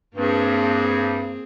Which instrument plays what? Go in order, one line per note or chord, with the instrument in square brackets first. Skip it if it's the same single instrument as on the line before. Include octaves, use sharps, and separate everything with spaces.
[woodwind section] G2 [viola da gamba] A#3 C4 G#4